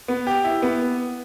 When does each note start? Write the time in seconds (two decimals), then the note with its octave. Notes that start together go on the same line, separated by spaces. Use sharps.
0.08 B3
0.27 G4
0.44 E4
0.62 B3